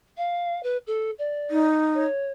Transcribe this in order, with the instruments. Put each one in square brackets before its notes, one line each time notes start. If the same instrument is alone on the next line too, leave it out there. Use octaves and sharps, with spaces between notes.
[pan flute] F5
B4
A4
D5
[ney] D#4
[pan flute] C#5